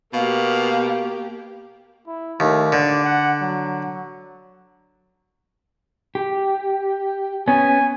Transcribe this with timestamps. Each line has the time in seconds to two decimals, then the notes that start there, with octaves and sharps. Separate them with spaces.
0.14 B2 A#3 G4 F5
2.07 E4
2.40 D#2 A3
2.72 D3 D5
3.05 F#5
3.42 F#3
6.15 G4
7.48 B3 C#4 G#5